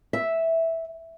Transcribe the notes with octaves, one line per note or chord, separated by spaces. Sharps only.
E5